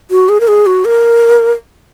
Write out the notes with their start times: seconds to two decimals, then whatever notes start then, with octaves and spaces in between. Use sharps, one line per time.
0.11 F#4
0.29 G#4
0.40 A#4
0.48 G#4
0.66 F#4
0.85 A#4